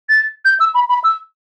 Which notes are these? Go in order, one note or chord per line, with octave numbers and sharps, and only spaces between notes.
A6
G6
E6
B5
B5
E6